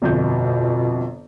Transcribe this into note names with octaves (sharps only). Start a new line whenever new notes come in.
G1 F2 B2 G6